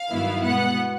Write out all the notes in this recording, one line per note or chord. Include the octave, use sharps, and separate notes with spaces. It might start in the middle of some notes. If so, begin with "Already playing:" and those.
Already playing: F5
G2 D#3 F#3 B3 E4
B2 G#3 B3 F#5